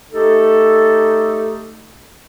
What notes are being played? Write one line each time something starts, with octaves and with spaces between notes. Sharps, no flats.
A3 D#4 G4 A4